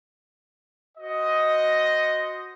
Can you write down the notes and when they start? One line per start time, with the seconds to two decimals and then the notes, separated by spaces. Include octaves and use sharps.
0.98 F#4 C5 D#5